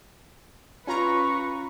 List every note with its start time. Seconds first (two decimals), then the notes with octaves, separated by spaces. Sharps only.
0.87 C#4 F4 B4 A#5 C#6